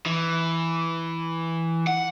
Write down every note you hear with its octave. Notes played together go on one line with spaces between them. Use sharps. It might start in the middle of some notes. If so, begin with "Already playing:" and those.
E3
F#5